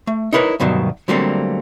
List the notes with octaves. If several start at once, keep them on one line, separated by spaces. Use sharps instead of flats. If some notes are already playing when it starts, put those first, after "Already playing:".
A3
D#4 E4 A#4 B4 C#5
D2 G2 B2 D#3 F#3
D3 F#3 G3 A3 A#3 C4